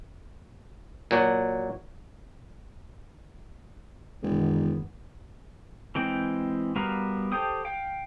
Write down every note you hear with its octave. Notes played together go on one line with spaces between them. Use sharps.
A#2 F#3 F#4
E1 F#2 D#3 B3
E3 G#3 C4 G5
G3 B3 F#4 A#4 F5
G4 A4 C5 G5 D#6
F5 G5